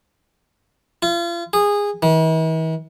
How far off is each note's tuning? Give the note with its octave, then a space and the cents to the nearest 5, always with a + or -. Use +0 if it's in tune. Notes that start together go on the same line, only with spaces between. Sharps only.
F4 -35
G#4 -20
E3 -45